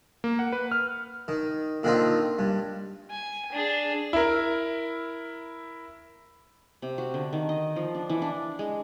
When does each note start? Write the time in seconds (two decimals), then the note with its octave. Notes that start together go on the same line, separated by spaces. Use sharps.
0.24 A#3
0.39 F#5
0.52 B4
0.71 F6
1.28 D#3
1.83 A#2 D3 D#3 C4 D#4 F4
2.39 G2
3.10 G#5
3.52 D4 G#4
4.13 E4 A#4
6.82 C3
6.98 F#4
7.14 D3
7.33 D#3
7.49 D#5
7.76 F3
7.94 D4
8.10 E3
8.22 D4
8.59 G#3